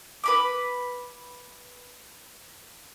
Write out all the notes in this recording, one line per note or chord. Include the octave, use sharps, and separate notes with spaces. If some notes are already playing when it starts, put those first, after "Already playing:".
B4 B5 D6